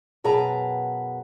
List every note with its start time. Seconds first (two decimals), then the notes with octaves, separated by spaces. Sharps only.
0.24 F#2 B2 G#4 B4 A5 A#5